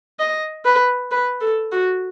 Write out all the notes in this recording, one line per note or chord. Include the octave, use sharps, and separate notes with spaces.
D#5
B4
B4
A4
F#4